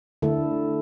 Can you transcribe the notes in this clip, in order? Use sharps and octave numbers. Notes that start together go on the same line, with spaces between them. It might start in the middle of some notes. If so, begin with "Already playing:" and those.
D3 A3 E4 A4